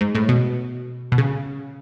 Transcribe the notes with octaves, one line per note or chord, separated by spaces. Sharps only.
G#2
A2
B2
B2
C#3